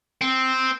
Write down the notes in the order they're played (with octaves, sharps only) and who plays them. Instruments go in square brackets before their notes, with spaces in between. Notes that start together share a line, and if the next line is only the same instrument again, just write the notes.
[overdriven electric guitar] C4